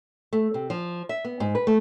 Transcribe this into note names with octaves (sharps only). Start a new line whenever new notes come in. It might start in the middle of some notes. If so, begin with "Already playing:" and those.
A3
C3
F3
E5
B3
G#2
B4
A3